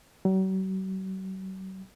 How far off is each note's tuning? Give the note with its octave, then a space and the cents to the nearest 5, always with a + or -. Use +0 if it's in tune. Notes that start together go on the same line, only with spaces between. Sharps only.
F#3 +45